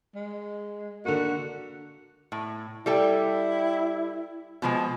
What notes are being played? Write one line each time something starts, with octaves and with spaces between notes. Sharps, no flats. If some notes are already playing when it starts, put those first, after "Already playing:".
G#3
D3 A#3 F#4
A2
G3 E4 A4 G5
B2 F3 G#3